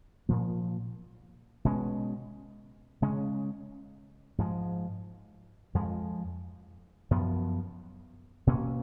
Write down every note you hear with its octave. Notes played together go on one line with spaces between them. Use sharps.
A#2 F3 A#3
B2 G#3 C#4
C#3 G#3 C#4
G#2 F3 G#3
F2 F3 G#3
F#2 F3 B3
B2 A#3 C#4